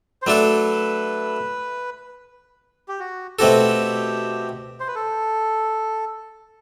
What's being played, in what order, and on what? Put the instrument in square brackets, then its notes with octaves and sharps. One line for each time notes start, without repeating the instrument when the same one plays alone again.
[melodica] C5
[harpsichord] F#3 A3 D4 A4 [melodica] B4
[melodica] G4
F#4
[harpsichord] B2 A3 C4 F#4 A4 [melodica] G4
[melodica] C5
B4
A4